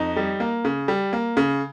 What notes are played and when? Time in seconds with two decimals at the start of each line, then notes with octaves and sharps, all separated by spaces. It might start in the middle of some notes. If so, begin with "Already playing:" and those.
Already playing: F2 D#4
0.16 G3
0.40 A#3
0.65 C#3
0.88 G3
1.13 A#3
1.37 C#3